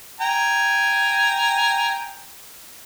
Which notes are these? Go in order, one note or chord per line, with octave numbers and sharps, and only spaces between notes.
G5 G#5 A#5